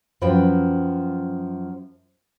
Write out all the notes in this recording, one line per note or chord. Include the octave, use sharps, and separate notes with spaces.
F#2 F3 B4 G5